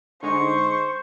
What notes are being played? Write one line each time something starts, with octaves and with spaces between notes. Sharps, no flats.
D3 G#3 D#4 C5 C#6